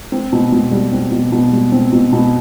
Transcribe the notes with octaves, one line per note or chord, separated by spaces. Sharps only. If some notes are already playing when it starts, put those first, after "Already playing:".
C4
B2
B2
G3
C4
B2
B2
G3
C4
B2
B2